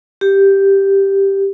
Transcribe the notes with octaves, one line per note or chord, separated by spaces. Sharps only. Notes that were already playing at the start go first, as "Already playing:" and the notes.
G4